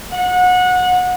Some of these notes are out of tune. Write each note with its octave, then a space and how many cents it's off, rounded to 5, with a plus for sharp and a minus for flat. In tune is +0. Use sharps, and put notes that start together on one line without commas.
F#5 -25